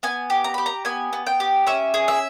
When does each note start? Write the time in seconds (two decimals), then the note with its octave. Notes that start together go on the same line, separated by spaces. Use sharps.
0.03 B3 G#5
0.30 G4
0.44 A#5
0.54 G4 B5
0.66 A#5
0.85 B3 G#5
1.13 B3
1.27 G5
1.40 G4
1.67 C#4 E5
1.94 G#4
2.08 E5